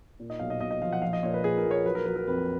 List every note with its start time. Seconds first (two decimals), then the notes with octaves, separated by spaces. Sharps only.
0.20 A#2
0.30 D#5
0.39 B1 F5
0.50 D#5
0.61 B1 D#5
0.71 D#5
0.82 F3 F5
0.93 F#5
1.02 A#1 F5
1.13 D#5
1.23 A#2 C#5
1.34 B4
1.43 A#2 G#4
1.58 A#4
1.65 A#1
1.71 C#5
1.85 F#3 B4
1.95 A#4
2.06 F#3 B4
2.16 A#4
2.27 F2 B4